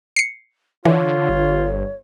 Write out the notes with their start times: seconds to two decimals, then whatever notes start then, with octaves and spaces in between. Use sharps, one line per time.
0.16 C7 C#7
0.85 D3 E3 F4 C#5
1.29 G1